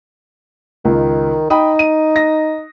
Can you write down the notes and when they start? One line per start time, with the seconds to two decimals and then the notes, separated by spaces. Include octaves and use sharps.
0.85 C#2 D#3
1.50 D#4 G5 B5 D#6
1.79 D#7
2.16 A#6